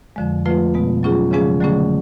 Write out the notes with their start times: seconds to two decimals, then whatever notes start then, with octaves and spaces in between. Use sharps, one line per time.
0.16 F2 D3 F3 G#3
0.45 F3 A3 F4 B4
0.74 B2 G#3 B3
1.03 F#3 C#4 F4 G#4
1.31 C#3 F3 G#3 C#4 G#4
1.61 D3 F#3 A3 C#4 G#4